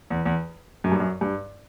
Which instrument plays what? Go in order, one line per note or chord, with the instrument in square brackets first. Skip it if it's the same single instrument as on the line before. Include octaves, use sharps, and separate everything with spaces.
[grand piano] E2
E2
F#2
G2
F#2
G2